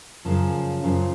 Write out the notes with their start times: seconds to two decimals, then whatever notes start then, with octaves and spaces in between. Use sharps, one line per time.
0.25 F#2 C#3 F3
0.84 F#2 C#3 F3